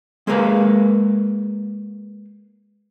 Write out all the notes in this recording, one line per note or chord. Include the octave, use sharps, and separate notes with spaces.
G#3 A#3 G#4 A#4 B4 F5